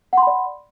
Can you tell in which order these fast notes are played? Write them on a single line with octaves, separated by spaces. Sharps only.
F#5 C6 B5 D5